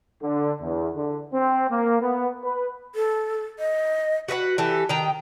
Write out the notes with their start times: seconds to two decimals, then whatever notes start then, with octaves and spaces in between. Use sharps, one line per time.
0.22 D3
0.61 E2
0.96 D3
1.34 C4
1.70 A#3
2.01 B3
2.43 B4
2.95 A4
3.59 D#5
4.28 F#4 B4 D#5 F#5
4.58 E3 G4 A4
4.89 D#3 G5 A#5